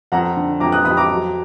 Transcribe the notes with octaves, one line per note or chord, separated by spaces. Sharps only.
F2 F#5 A#5
D3
F2 A#5 D6
D#6 F#6
F2 B5 D#6
A#5 D6
F#3